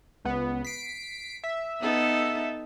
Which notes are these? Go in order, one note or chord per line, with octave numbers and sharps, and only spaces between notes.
C#2 B3
B6 C7 D7
E5
B3 D#4 A4